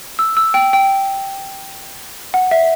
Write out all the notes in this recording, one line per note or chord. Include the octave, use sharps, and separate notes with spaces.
E6
E6
G5
G5
F#5
E5